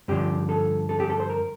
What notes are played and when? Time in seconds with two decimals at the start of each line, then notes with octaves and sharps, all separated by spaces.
0.08 G2 D3 F3 G4
0.49 A4
0.89 A4
1.00 G4
1.10 A4
1.20 C5
1.30 A#4